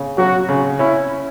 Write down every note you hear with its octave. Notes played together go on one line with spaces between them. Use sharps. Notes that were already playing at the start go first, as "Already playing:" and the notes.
Already playing: C#3
F#3 F#4
C#3
C#4 E4